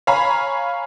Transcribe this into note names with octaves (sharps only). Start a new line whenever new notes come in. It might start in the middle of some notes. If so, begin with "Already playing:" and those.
C#5 F5 G#5 A#5 B5